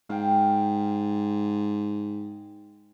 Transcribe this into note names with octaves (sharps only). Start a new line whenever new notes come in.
G#2 F5 G5